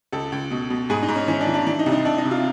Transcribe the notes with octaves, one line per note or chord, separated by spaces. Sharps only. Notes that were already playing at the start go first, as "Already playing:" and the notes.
C#2 A4
C#2
B2
B2
G#2 G#4
D#4
G#2
C#4
E3 C#4
D4
E3
D4
E3 D4
D#4
C2
D#4
C2 D4
D#4
C3
F4